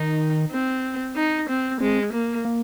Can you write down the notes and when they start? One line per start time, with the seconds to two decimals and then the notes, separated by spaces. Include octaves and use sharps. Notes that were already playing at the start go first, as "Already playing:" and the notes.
Already playing: D#3 D#4
0.52 C4
1.16 D#4
1.49 C4
1.80 G#3 C4
2.13 A#3
2.45 A#3